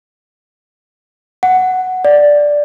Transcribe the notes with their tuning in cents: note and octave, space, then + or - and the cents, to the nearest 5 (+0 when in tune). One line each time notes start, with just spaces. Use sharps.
F#5 +0
D5 +0